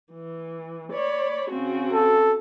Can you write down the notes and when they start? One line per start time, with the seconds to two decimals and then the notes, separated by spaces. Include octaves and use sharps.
0.13 E3
0.91 C#5 D5 B5
1.49 C#3 C4 F#4
1.93 A4